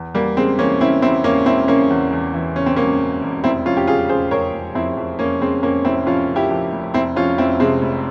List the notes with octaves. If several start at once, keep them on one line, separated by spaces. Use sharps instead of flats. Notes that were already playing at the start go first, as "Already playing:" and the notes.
Already playing: E2
E2 G3 A#3
C#3 G#3 C4
E3 A#3 C#4
C#3 C4 E4
E2 C4 E4
E1 A#3 C#4
E1 C4 E4
C#3 A#3 C#4
E2
E2
E3
C#3 C#4
C4
E1 A#3 C#4
C#3
E1
F1 C4 E4
F2 C#4 F4
G4
C#3 F4 G#4
C#3 G#4 C5
F1 A#4 C#5
F1
F2 C4 E4
F2
F1 A#3 C#4
C#3 G#3 C4
F2 A#3 C#4
F1 C4 E4
F2 C#4 F4
C#3
E4 G4
F2
F1
F1 C4 E4
F2 C#4 F4
F1 C4 E4
C3 G#3 C4
F1